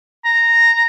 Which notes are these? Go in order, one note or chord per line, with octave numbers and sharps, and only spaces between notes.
A#5